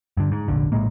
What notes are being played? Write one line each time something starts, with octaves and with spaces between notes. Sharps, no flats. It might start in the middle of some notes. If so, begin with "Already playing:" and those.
G2 D3
G#2
F1 A#1 D3
A#1 A2 G#3 A#3